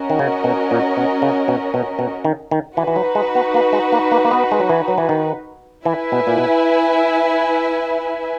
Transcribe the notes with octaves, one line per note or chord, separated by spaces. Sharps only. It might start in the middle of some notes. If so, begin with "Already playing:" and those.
Already playing: C#4 F#4 A#4 D#5
D#3
C#3
B2
A#2
B2
C#3
B2
B2
B2
D#3
D#3
E3 D#4 F#4 B4
E3
F#3
G#3
B3
A#3
G#3
A#3
A#3
A#3
B3
G#3
F#3
E3
F#3
E3
D#3
E3 E4 B4 E5 G#5
B2
A#2
B2